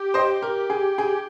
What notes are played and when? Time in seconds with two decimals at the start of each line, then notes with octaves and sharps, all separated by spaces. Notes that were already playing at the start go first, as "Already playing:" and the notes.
Already playing: G4
0.14 C5 D#5
0.42 A#4
0.70 G#4
0.98 G#4